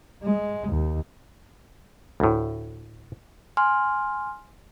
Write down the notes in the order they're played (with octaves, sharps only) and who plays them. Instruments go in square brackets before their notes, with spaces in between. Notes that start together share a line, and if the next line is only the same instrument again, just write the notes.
[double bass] G#3
D#2
[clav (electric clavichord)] D2 A2
[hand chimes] G#5 C6 F6